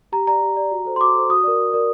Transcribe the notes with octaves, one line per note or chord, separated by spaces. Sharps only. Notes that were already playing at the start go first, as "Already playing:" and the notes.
G4 A#5
D5 A#5
G4
D5
F#4
A4 C5
C6
F#4 D6
A4 C5
F#4 D#6
A#4 D5
F#4
A#4 D5